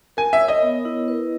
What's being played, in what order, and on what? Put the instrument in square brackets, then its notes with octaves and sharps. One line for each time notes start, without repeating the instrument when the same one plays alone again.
[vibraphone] A#4 [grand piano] G#5
[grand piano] E5
[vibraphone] C#5
[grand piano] D#5
[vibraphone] B3
E4
B4